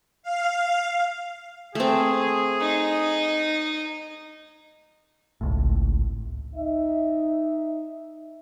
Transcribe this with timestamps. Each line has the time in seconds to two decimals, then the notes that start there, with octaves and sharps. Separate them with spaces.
0.23 F5
1.75 A3 C4 G#4
2.60 D#4
5.41 G#1 C#2 A2
6.55 D#4 E5